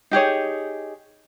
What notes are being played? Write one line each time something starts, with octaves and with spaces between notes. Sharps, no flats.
D#4 G4 G#4 C#5